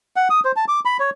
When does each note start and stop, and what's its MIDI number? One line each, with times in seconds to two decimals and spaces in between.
0.16 0.28 78
0.30 0.40 87
0.45 0.52 72
0.56 0.65 81
0.68 0.80 86
0.85 0.97 83
1.00 1.10 73